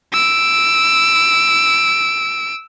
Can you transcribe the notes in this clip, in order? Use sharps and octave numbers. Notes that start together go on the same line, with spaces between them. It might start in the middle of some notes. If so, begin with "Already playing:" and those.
E6 D7